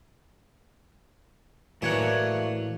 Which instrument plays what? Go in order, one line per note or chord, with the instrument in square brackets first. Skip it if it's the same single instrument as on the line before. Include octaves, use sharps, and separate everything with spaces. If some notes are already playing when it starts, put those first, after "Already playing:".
[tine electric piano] A2 E3 [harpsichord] F#3 A#3 D4 [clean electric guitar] A3 C#5 F#5